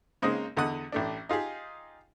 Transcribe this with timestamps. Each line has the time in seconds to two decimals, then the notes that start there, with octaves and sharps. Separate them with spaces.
0.22 C#3 G#3 A#3 C4 D#4
0.57 E2 D3 D#5 F#5 D#6 F#6
0.92 A1 A3 D4
1.29 D#4 F4 G4 G#4